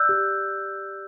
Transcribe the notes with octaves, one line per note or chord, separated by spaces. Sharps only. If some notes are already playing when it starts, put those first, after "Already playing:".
Already playing: D5 E6 F#6 G6
G4